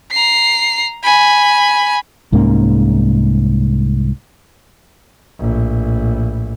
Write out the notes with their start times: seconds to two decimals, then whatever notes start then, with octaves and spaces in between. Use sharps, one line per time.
0.11 A#5 C7
1.03 G#5 B5
2.32 C2 G#2 A#3 C#4
5.39 A#1 A2